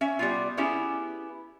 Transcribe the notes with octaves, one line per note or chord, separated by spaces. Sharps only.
C#4 E5
G3 B3 F4
B3 C#4 E4 G4 G#4